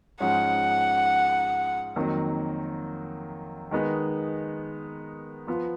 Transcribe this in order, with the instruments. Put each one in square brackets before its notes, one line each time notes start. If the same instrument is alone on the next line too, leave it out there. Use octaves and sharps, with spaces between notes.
[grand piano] G#2 F3 G#3 C#4 [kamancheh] F#5
[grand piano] F2 D#3 F#3 A#3
D#3 G#3 B3 D#4
F3 B3 F4